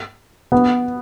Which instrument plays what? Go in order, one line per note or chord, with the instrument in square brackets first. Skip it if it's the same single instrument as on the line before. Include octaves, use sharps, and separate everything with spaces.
[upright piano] B3